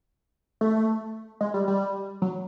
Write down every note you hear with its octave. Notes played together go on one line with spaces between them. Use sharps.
A3
G#3
G3
G3
F#3